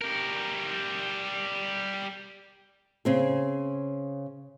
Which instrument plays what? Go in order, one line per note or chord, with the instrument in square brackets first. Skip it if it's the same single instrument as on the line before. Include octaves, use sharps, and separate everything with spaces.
[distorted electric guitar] G3 A#4
[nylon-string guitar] C#3 C4 G#4